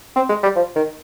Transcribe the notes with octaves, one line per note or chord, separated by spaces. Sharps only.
C4
G#3
G3
F3
D#3